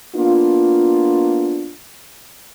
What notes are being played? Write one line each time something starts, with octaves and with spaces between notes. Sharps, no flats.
A#3 B3 D4 F4